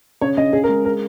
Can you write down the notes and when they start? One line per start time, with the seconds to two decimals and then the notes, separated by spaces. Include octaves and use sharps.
0.21 C#3 C#5
0.37 C#3 D#5
0.53 C#3 G#4
0.64 A#4
0.69 G#3
0.85 A#4